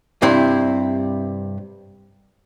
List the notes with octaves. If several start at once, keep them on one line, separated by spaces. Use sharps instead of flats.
G2 C3 C4 E4